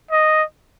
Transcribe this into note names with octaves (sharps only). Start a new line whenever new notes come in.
D#5